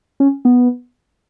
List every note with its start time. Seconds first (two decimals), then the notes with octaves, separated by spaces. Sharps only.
0.20 C#4
0.45 B3